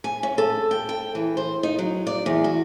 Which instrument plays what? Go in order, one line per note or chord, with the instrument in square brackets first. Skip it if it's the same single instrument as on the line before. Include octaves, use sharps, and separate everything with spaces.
[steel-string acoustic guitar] G#5
C#4
A4
G5
G5
E3
C5
D#4
F#3
D5
E2
F#4